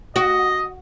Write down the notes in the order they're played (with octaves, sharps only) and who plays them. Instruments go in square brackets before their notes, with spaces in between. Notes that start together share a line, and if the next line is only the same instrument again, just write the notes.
[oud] F#4 [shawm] D#5